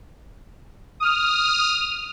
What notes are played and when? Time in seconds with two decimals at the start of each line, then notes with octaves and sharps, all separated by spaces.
1.00 D#6 F6